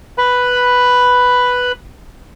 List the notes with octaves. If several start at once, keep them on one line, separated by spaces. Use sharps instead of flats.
B4 B5